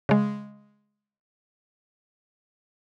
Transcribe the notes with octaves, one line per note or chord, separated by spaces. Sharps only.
C#3 G#3